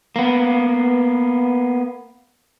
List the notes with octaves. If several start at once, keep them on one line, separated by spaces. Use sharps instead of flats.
A#3 B3